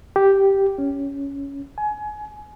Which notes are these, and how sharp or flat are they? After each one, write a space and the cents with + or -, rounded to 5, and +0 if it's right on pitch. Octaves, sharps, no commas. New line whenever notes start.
G4 -5
C#4 +10
G#5 +25